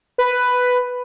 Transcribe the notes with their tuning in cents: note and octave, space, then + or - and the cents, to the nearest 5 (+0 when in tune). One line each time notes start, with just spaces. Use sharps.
B4 +5